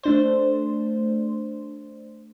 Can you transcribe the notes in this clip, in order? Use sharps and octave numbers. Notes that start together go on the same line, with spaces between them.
A3 D4 C5